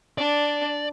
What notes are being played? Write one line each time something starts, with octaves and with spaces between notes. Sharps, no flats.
D4 D5